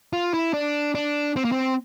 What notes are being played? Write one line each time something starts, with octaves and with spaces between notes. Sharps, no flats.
F4
E4
D4
D4
C4
A#3
C4